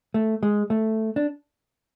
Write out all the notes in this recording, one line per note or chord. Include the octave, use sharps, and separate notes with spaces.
A3
G#3
A3
D4